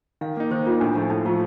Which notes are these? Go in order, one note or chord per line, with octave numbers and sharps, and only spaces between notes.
D#3 F5
A#3 D#4
D#3 C5
A#3 D#4 F4
A2 D4
F3 A3 D4
A2 D#4
F3 A3 F4